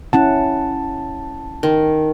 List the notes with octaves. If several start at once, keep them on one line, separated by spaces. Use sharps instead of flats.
C#4 E4 F#5 A5
D#3